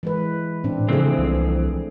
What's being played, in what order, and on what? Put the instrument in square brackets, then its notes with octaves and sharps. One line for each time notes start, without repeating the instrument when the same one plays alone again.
[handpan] E3 G#3 B4
[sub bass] A2 [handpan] C4 D4
[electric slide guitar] F2 E3 C4 [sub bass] C#3 [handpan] A3 G#4
[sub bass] C2